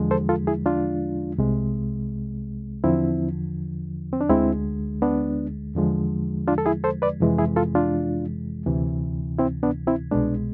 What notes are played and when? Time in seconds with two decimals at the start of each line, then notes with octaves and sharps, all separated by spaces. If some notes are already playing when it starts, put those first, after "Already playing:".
Already playing: E2 D3 F3 G#3
0.11 A4 C5
0.29 F4 A4
0.47 E4 G#4
0.66 D4 F4
1.38 C2 C3 G#3
2.84 E2 D3 F3 C4 E4
4.13 C4
4.21 D4
4.29 D2 D3 G#3 C4 E4
5.02 B3 D4
5.75 E2 D3 F3 G#3
6.48 D4 F4
6.58 A4
6.66 E4 G#4
6.84 A4 C5
7.02 B4 D5
7.20 F2 C3 E3 G#3
7.39 E4 G#4
7.56 F4 A4
7.75 D4 F4
8.66 D2 C3 E3
9.38 C4 E4
9.63 B3 D4
9.87 C4 E4
10.12 C2 B2 G#3 B3 D4